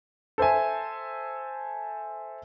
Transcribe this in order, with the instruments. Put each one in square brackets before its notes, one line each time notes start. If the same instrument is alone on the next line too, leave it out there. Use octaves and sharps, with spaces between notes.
[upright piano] A4 C5 E5 G#5